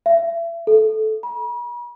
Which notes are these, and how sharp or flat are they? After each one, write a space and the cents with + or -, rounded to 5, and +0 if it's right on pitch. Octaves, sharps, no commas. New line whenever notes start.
E5 +35
A4 -15
B5 -45